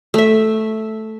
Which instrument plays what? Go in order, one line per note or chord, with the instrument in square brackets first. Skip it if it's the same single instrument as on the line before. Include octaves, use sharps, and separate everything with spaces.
[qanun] A3 E5